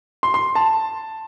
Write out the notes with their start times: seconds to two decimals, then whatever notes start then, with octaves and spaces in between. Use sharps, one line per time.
0.23 C6
0.34 C6
0.55 A5